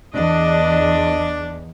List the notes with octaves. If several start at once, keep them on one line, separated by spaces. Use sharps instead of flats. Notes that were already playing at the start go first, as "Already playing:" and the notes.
E2 D4 D#5